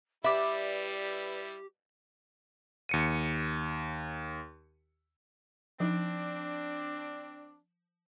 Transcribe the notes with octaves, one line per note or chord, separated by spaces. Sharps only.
G3 E4 G4 B4 D5 E5
D#2 C#7 D#7
F3 C4 D4 D#4